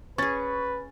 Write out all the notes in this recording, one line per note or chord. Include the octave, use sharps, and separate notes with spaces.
C#4 G#4 B4 C#6 A6